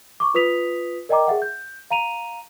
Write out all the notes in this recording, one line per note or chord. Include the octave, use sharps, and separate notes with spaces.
C#6 D6
F4 B4 D#6 B6 F7
A#4 D5 D#5 G5 A#5 D6
G#4 E5 F#5
G6
F5 A#5 D#7 F7